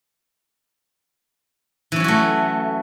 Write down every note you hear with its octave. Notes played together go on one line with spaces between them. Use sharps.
E3 F#3 A3 C#4 F#4